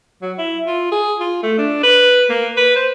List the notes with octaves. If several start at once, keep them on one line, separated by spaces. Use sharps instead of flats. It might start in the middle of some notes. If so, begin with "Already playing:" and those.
F#3
E4
F4
G#4
F4
A3
D4
B4
A#3
B4
C5